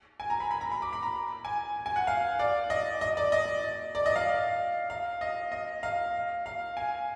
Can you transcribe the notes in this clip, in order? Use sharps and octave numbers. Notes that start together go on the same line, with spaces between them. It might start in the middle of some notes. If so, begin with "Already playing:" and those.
G#5
A#5
B5
B5
A#5
B5
D6
B5
A#5
G#5
G#5
F#5
F5
D5
D#5
D#5
D5
D#5
D5
D#5
F5
F5
D#5
D#5
F5
F5
G#5